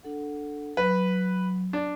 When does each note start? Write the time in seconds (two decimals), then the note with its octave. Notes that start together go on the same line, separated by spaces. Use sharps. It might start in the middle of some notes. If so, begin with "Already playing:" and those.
0.03 D4 A4 F#5
0.77 F#3 B4
1.73 D4